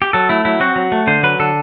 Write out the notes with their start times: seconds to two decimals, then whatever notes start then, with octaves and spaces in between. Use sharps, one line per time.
0.02 G4
0.13 F#3 A4
0.29 A3 E4
0.45 F#3 E4
0.60 C4 F#4
0.76 F#3
0.92 A3
1.07 D3 C5
1.23 F#3 B4
1.39 D3 A4